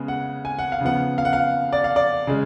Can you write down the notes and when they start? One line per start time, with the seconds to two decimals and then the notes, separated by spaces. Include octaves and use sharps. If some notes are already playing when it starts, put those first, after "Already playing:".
Already playing: C#3 G#3 B3
0.08 F#5
0.45 G#5
0.59 F#5
0.72 F5
0.81 C#3 F3 B3 F#5
1.18 F5
1.25 F#5
1.33 F5
1.73 D5
1.84 F5
1.96 D5
2.27 C#3 G#3